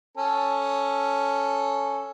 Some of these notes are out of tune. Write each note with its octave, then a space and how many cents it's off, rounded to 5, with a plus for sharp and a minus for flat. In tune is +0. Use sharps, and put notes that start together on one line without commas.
C#4 +0 A4 +0